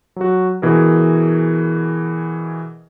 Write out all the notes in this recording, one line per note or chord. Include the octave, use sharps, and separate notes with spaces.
F#3 F#4
B2 E3 G#4 A#4